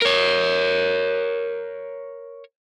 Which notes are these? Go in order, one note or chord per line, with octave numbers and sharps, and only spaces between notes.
A#4 C#5